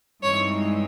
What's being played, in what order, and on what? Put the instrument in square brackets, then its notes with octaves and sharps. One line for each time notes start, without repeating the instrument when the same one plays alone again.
[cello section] G2 E3 G#3 C4 D#4 [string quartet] C#5